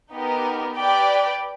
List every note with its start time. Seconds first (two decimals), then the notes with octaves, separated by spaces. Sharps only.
0.14 B3 D#4 G4 A#4
0.77 G4 B4 D5 G5